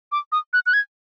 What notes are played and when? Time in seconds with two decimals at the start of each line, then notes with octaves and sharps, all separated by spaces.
0.12 D6
0.32 D#6
0.53 F#6
0.66 F#6
0.73 G#6